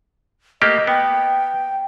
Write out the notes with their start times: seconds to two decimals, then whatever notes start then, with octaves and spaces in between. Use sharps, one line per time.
0.62 A3 A#3 G4 D#5
0.87 B3 G5